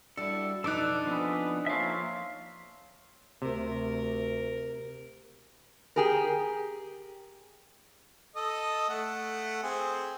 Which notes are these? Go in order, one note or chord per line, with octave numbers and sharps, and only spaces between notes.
G3 D4 E4 F#4 A4
B1 F2 D4 D#4 A4 B4 D6 F#6
F3 B3 C4 G#4 B4 D#6
F3 A#3 F4 A4 C5 C#5 E5 F5
D2 C3 A#4
G4 G#4 A#4
A4 D#5
A3 F#5
C4 G#4